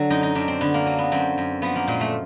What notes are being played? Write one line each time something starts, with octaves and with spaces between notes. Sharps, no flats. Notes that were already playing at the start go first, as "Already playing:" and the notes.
Already playing: D3 F#3
F#2 D#4
D#4
F#2 D4
C4
D3 B3
A#3
F#3
B3
F#2 C4
F#2
F3 B3
A#3
A#2 G#3
A3